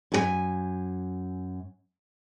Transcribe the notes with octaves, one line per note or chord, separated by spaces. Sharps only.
F#2 G#4 G#5